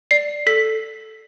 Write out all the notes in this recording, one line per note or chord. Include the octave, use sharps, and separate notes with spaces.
D5 C7
A4 B6